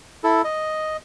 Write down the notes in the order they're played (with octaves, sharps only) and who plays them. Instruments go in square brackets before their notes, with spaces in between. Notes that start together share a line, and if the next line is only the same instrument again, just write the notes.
[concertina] E4 A4
D#5